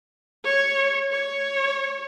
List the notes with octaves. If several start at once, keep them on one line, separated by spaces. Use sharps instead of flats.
C#5
C#5